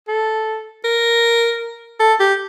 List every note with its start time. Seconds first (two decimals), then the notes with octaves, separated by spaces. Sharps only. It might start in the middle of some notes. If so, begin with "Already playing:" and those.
0.08 A4
0.84 A#4
2.00 A4
2.20 G4